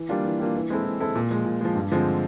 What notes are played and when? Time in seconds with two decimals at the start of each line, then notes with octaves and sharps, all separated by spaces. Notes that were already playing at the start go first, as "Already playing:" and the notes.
Already playing: E3
0.09 G3 A#3 D4 F4
0.25 E3
0.40 G3 A#3 D4 F4
0.55 E3
0.70 G#3 C4 E4 A4
0.85 E3
1.00 G#3 C4 E4 A4
1.15 A#2
1.31 F3 G#3
1.46 A#2
1.61 F3 G#3
1.75 G2
1.91 D3 F3 G#3 C4